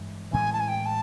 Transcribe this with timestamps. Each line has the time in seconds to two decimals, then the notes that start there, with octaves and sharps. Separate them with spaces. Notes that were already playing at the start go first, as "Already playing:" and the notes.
Already playing: G2 E3 G#3
0.33 A2 E3 G#3 C4 G#5
0.53 A5
0.60 G#5
0.68 G5
0.86 A5